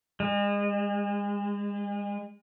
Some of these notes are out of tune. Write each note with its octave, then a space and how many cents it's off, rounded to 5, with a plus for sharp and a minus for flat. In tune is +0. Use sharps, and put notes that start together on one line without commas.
G#3 -35